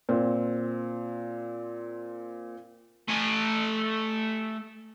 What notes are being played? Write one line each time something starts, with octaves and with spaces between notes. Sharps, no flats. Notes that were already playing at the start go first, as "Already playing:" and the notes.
A#2 C4
A3 G#5